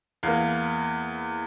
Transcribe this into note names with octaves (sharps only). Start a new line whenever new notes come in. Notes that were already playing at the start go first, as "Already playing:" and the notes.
E2 E3 A#3 F5